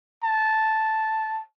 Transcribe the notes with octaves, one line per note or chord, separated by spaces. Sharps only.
A5